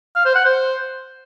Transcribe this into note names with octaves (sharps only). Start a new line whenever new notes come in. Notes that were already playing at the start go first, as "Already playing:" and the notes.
F5
C5
F#5
C5